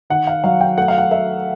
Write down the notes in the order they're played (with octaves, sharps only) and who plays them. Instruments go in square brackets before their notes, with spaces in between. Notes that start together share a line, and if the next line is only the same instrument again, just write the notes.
[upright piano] D#3 F#5
F5
F#3 F5
G5
A3 F#5
F5
F#5
A3 E5